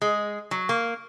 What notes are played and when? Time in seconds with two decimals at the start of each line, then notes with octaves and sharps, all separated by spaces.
0.02 G#3
0.51 F#3
0.69 A#3